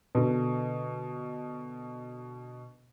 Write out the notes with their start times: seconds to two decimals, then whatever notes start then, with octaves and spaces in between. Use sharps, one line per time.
0.15 B2 D3